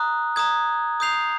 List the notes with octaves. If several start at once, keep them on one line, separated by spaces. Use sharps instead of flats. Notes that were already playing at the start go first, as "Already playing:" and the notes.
Already playing: A#5 D#6 F#6
A#5 D#6 G#6
D#6 G6 C7 F7